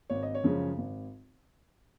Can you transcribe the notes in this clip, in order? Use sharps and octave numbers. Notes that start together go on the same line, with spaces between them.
G#1 C#5
D#5
C#5
F#2 C#3 F3 G#3
G#1